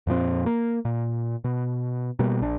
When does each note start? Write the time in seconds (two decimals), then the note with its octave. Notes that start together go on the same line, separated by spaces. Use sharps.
0.07 F2 A#2 F3 C4
0.46 A#3
0.85 A#2
1.44 B2
2.19 B2 G3 A#3
2.41 A#1 D4